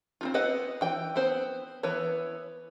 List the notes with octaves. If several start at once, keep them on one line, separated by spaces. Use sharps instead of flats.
C4 D#4 F4
B3 C4 B4 D#5 F#5
E3 G5
B3 C4 C5
E3 B3 E4 B4 C#5